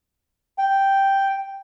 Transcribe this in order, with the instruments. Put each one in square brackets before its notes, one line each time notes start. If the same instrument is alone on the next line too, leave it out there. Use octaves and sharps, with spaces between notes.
[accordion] G5